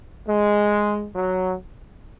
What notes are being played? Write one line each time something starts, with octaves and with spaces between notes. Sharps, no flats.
G#3
F#3